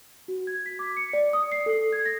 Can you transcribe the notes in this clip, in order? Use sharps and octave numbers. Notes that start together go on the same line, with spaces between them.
F#4
G#6
B6
D6
C#7
D5
D#6
C7
A4
G#6
A#6